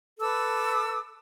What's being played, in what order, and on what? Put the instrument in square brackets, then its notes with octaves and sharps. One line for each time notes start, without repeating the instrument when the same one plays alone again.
[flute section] A4 B4 D6 E6